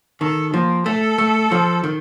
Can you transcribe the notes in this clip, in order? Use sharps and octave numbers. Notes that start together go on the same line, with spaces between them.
D#3 A4
F3 A#3
A3 A4
A3
F3
D#3